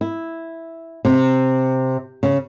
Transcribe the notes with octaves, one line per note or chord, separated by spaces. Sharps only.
E4
C3
C#3